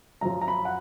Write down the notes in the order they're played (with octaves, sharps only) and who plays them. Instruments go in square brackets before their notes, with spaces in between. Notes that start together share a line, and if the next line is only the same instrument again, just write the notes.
[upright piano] F#2 F3 A#5
A#5
B5
F#5